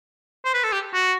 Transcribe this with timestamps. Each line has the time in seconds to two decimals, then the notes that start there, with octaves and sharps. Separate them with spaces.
0.45 C5
0.54 B4
0.64 A4
0.73 G4
0.94 F#4